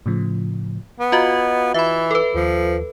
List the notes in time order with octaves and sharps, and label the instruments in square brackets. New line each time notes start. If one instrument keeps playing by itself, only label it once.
[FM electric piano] A2 C#3 F3
[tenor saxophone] B3
[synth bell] F4 F#4 D#5 [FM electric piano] F5
[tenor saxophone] E3 [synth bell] E5 B5
[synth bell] A4 B4
[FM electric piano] D#2 [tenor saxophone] F3